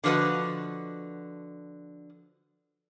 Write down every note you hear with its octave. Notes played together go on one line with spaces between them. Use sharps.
D3 F3 F#4 B4 D#5